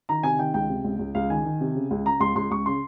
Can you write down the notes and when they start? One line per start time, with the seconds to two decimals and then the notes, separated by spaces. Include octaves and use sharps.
0.09 D#3 A#5
0.23 C3 G#5
0.38 D#3 G5
0.54 C#2 G5
0.69 C3
0.84 C#2
0.99 C#2
1.15 C#2 F5
1.30 D#3 G#5
1.45 D#3
1.61 C3
1.75 C#3
1.91 C#2
2.05 C#3 A#5
2.20 C#2 C6
2.35 C#2 C6
2.51 C#2 C#6
2.66 C#3 C6